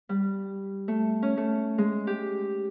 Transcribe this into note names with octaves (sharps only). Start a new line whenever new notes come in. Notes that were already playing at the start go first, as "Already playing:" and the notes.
G3
A3
C#4
A3
G#3
G4